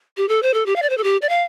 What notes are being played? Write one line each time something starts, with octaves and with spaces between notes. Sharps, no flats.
G4
A4
C5
A4
G4
F5
D5
C5
A4
G4
D5
F5